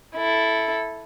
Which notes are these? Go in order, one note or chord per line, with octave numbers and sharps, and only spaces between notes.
E4 A4